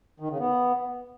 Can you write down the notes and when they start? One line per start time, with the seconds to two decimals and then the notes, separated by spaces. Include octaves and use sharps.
0.20 D#3
0.30 C#3
0.39 B3